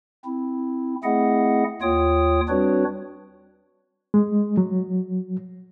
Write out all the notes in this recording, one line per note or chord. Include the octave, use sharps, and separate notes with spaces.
C4 E4
A3 C4 E4 G#4 D#5 F#5
D#2 F4 C#5 G5 D#6
G3 C4 D4 F#4 B4 C#5
G#3
F#3